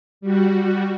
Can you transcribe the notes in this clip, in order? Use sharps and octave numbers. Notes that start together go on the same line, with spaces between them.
G3 F#4